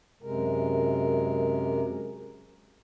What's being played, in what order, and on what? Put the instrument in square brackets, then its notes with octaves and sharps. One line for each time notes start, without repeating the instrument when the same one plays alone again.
[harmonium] F#2 C3 G#3 A#4